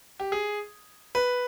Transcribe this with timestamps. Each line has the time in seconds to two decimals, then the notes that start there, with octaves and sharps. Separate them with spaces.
0.20 G4
0.32 G#4
1.15 B4